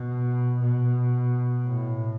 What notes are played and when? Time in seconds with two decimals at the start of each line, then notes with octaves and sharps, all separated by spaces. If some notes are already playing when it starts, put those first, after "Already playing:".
Already playing: B2
0.60 B2
1.66 A2